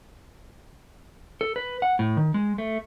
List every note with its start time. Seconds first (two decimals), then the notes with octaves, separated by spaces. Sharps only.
1.41 A4
1.56 B4
1.82 F#5
1.99 A2
2.17 D#3
2.34 G#3
2.58 A3